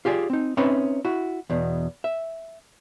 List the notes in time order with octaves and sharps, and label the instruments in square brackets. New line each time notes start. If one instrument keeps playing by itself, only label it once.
[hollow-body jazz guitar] F4 G4 G#4 D5
C4 D#4
C4 C#4 D#4 B4 D#5 E5
E4 F#4
E2 B2
E5